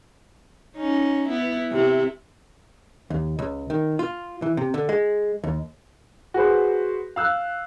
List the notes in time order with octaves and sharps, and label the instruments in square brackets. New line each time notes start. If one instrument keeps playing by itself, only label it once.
[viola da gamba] C#4 D#4
B3 E4
C3 E4
[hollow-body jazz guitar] D#2
C#2
D#3
F4
E3
C3
D3
G#3
D#2
[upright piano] F#4 G#4 B4 C5
F5 E6 F#6